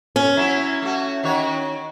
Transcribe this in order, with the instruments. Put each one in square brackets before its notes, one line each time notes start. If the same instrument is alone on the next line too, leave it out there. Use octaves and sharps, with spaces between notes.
[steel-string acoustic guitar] C#4
[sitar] F#3 E4
A3 F#4
D#3 F#4 C#5